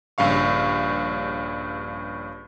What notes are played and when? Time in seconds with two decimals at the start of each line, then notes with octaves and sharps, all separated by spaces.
0.18 A#1 G2 C#3 F5 C#6